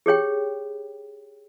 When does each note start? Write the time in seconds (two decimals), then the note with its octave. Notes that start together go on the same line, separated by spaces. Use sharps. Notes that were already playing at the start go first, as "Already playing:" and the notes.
0.06 G4 G#4 C#5 G5